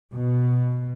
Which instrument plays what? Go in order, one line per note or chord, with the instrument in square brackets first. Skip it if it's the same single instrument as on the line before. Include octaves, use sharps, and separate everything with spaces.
[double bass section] B2